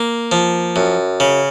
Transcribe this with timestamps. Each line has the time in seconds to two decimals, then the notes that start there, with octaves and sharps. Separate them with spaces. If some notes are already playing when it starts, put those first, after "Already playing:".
Already playing: A#3
0.32 F3
0.76 F#2
1.20 C#3